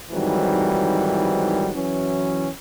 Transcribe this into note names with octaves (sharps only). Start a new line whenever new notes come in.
F2 G#2 D#3 E3 F#3 G3
E3 F#3 C#4